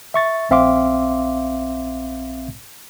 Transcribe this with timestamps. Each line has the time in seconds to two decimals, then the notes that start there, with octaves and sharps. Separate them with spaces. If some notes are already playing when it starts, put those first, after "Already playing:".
0.14 E5 C#6 A6
0.50 A#1 C4 E5 F5 C6 D6